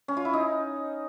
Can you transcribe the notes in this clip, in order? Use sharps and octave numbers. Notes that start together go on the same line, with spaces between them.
C#4
F4
E4
D#4